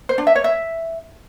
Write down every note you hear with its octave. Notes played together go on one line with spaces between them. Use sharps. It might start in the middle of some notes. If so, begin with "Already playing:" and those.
C5
D4
E5
C#5
E5